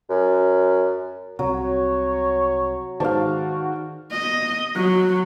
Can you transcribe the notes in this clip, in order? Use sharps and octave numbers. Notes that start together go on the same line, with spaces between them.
F#2
C2 C3 F#3 C#5
G#2 D#3 F#4 C5 D5 F5 A5
D#5
F#3